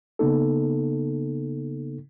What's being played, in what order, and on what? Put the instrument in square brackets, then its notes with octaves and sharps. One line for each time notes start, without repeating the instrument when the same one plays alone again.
[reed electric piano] C#3 A#3 B3 D#4 A4